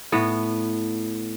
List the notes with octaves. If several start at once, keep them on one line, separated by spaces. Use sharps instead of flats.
A2 B3